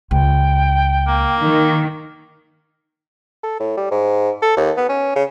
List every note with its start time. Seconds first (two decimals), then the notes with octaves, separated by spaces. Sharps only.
0.11 C#2 G5
1.08 A#3
1.41 D#3
3.43 A4
3.60 A2
3.77 G3
3.91 G#2
4.42 A4
4.57 D#2
4.77 B3
4.89 C#4
5.15 C#3